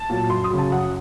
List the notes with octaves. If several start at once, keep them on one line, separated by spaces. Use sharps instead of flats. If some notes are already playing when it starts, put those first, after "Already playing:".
Already playing: A5
A#2 F#3
F#2 C6
D#6
C#3 F#3
A5
F#2 F#5